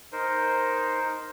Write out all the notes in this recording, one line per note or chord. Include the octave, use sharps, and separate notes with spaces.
D#4 A#4 C5